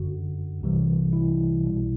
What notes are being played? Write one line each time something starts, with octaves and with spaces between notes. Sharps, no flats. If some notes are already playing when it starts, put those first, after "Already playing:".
Already playing: G1 F#2 D3 F#4
C2 C3 E3 G3
E4
B1 B2 G3